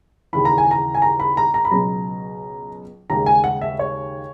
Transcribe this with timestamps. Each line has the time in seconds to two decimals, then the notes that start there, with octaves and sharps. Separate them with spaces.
0.33 D#2 C#3 E3 B5
0.45 A#5
0.58 G#5
0.71 A#5
0.95 G#5
1.02 A#5
1.20 B5
1.37 A#5
1.54 A#5
1.65 B5
1.71 C#2 B2 F#3 A#5
3.10 D#2 C#3 G#3 A#5
3.26 G#5
3.44 F#5
3.61 E5
3.79 C#5